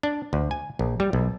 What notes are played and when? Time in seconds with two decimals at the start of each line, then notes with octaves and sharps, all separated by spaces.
0.03 D4
0.33 D2
0.51 G#5
0.79 A#1
1.00 G3
1.13 B1